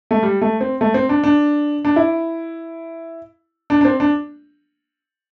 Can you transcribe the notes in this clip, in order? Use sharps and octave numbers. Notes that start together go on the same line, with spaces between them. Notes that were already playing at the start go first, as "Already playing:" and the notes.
A3
G3
A3
C4
A3
C4
D4
D4
D4
E4
D4
D4
C4
D4